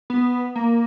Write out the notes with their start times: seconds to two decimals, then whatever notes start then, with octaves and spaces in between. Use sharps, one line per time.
0.10 B3
0.55 A#3